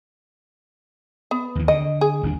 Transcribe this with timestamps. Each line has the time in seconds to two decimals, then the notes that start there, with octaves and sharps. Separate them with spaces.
1.31 B3
1.55 D#2 E3
1.68 D3 D#5
2.01 G#4
2.23 G1 D#2 D4